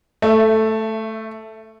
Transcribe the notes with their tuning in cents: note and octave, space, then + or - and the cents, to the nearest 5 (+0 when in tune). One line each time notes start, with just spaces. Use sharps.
A3 +0 E5 +25